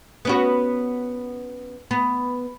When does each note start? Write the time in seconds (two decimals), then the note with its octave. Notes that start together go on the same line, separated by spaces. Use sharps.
0.25 B3 C#4 F#4
1.91 B3